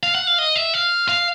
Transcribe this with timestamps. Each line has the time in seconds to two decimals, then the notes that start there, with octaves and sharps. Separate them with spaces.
0.03 F5
0.15 F#5
0.27 F5
0.39 D#5
0.56 E5
0.74 F5
1.09 F5